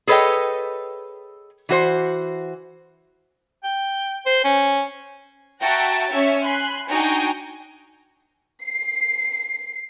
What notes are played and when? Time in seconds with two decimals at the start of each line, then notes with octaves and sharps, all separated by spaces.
0.07 G#4 A4 B4 C#5 D#5 G5
1.69 E3 F#4 C5
3.64 G5
4.26 C5
4.44 C#4
5.60 F#4 E5 F#5 G5 A5 A#5
6.10 C#4 C#5 E5
6.42 G#5 B5 C6 F#6
6.87 D4 D#4 F#4 G5 G#5 A#5
8.64 C7